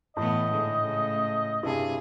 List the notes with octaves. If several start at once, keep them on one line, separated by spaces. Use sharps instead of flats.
A2 E3 A3 B3 D#5
G#2 D3 G#3
C#3 A3
G2 C3 E4 G#4